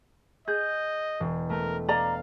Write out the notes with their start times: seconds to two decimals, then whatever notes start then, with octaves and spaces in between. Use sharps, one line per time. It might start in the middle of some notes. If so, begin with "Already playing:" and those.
0.48 G#4 D#5 G6
1.20 E1
1.50 A3 A#4
1.89 D5 D#5 F5 A#5